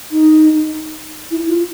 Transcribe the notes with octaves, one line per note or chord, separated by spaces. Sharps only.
D#4
E4
F4